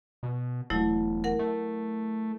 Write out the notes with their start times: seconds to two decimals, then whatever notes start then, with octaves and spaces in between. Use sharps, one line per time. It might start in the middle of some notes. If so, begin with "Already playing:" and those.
0.23 B2
0.70 E1 F#3 A3 E4
1.24 A#4 F#5
1.39 A3